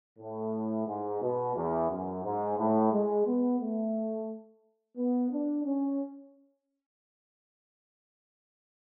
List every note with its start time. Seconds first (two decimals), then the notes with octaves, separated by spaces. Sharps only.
0.19 A2
0.87 G#2
1.22 B2
1.56 E2
1.90 F#2
2.24 G#2
2.58 A2
2.92 G#3
3.27 B3
3.60 A3
4.97 B3
5.31 D4
5.65 C#4